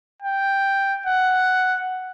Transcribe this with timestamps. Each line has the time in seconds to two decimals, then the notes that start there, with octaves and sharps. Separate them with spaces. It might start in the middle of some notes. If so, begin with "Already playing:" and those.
0.22 G5
1.06 F#5